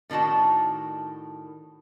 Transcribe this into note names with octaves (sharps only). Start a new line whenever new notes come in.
A2 D#3 D4 F#4 A5